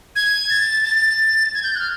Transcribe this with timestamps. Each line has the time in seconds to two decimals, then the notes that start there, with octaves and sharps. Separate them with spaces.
0.16 G#6
0.50 A6
0.84 A6
1.55 G#6
1.63 G6
1.75 F#6
1.80 F6